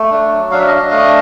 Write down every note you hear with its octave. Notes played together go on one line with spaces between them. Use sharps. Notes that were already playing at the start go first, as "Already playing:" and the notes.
Already playing: A3
D4
F#3
D4 F5
E5
D4 D#5 F5
A3